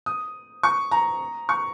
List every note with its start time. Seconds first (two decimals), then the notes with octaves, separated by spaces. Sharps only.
0.06 D#6
0.63 C#6
0.91 A#5
1.49 C#6